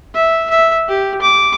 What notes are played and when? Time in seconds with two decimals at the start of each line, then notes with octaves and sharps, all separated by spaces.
0.14 E5
0.50 E5
0.88 G4
1.22 D6